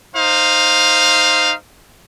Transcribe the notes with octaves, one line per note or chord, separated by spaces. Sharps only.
D#4 C5 F5